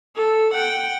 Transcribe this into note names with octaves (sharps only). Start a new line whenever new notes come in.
A4
F#5 G5